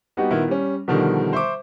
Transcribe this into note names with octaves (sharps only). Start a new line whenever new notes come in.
G3 B3 D#4 F#4 G4
A#2 D#3 B3 E4
G3 C#4
B2 D3 D#3 F3 G3
C5 E5 C#6 D6